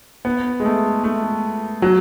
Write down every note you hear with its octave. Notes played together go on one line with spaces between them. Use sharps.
B3
G#3
A3
A3
F#3